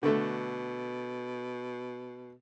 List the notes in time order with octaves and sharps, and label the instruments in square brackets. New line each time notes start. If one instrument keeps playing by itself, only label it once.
[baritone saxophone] B2 [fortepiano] D3 A3